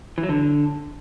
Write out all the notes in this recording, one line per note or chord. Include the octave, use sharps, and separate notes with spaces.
E3
F#3
D3